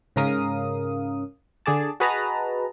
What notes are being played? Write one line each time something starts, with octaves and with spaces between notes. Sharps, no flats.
G#2 C#3 C#4 A#4 F5 D#6
D3 G#4 D5 A5
F#4 G#4 B4 D#5 A5 A#5